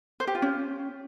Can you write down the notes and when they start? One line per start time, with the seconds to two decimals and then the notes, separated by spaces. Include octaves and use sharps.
0.20 C5
0.27 G4
0.35 F4
0.42 C#4